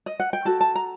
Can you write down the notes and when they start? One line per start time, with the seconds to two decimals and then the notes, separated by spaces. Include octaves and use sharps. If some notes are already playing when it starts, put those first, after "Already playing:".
0.06 D#5
0.20 F#5
0.33 G5
0.45 F#4 A4 A5
0.61 A5
0.75 A#5